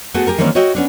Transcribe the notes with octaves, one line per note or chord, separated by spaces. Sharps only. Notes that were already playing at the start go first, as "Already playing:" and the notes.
A3 B3 F#4 G#4
G4 G#4 A#4
D#3 E3 G3 A#3 C4 C#4
F#4 C#5 D#5 E5 G5
B3 C#4 D4